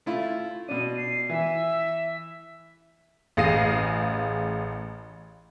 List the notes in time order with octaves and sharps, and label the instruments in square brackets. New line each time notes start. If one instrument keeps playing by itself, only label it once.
[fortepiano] A3 E4 F4
[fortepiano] B2 D4 [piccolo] D#7
[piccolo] C7
[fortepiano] E3 [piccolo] E5
[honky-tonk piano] A1 G#4 F5 A#6 C7 D#7